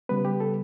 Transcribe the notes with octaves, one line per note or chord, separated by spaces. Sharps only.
C#3 G3 B3 B4
G4
A4